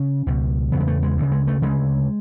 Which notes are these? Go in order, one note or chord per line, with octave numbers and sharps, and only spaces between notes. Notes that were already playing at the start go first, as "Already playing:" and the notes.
Already playing: C#3 C#4
C#2 B2
E2 C#3 B3
G#3
A3
G#3
D2 C#3
G#3
A3
D2 C#3 G#3